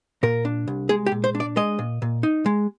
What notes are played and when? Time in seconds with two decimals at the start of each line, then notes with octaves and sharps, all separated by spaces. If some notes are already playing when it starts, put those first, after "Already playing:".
0.23 A#2 A#4
0.45 D4
0.68 C2
0.89 G#3 G#4
1.06 G4
1.12 A#2
1.24 C5
1.35 D4
1.40 D5
1.57 G#3 D#5
1.79 A#2
2.02 A#2
2.23 D#4
2.46 G#3